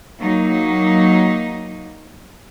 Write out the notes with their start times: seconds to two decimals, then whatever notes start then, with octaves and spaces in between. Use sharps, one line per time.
0.19 F#3 A#3 D#4